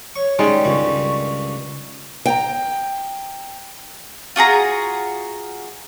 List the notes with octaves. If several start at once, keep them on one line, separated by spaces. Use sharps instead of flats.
C#5 C#6
D#3 G3 G#3 C#4 D5
C#2 G2 C#3 C#6
G5 A#5
F4 F#4 G#4 A#5